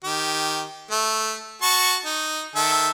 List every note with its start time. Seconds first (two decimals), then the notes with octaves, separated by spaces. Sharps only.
0.04 D#3 G4
0.91 A3
1.62 F#4 A5 C#6
2.05 D#4
2.56 D#3 A4 E5